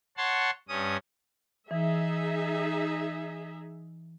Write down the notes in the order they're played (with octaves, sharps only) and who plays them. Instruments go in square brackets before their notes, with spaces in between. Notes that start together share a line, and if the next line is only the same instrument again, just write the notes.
[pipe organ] C#5 F#5 A5 C6
G2 C#4 D#6
[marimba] E3 [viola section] D#4 G#4 E5